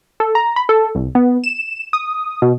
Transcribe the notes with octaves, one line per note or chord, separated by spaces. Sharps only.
A4
A#5
B5
A4
C2
B3
E7
D#6
B2